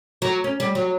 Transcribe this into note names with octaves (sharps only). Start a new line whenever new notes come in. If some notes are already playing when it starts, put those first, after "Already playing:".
F#3
C#4
G3
F#3